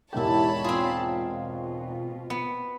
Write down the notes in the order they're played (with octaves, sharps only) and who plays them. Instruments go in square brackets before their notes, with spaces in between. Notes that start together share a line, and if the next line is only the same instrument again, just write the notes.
[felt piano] E1 G#2 A#4 [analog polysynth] E4 G4 [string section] C#5 A5 B5
[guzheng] C4 G#4 [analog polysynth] F4
[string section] B2
[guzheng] B3 [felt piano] C#7